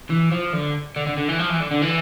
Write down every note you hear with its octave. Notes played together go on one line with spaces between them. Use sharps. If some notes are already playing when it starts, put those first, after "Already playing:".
E3
F3
D3
D3
D3
D3
E3
F3
E3
D3
D3
E3